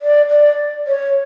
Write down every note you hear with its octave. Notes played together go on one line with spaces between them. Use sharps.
D5
D5
C#5